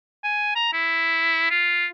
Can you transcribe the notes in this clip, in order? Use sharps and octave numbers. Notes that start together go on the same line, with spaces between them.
G#5
A#5
E4
F4